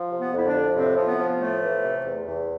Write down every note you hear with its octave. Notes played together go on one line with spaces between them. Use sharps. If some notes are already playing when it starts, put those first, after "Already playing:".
Already playing: F3
C3
B3
F2 E4
D3 D4
F2
A2 C3 C4
F3
B3
F3
A3
A2
E3
C3
E2
E2